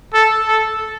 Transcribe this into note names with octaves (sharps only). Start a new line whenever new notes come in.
A4
A4